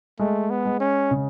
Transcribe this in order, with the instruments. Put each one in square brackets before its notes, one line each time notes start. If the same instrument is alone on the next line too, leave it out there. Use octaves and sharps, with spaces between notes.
[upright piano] G#3 [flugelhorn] A3
[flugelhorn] B3
[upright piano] G#3
[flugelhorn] C#4
[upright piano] C#3